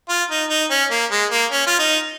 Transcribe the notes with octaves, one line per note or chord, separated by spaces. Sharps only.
F4
D#4
D#4
C#4
A#3
G#3
A#3
C#4
F4
D#4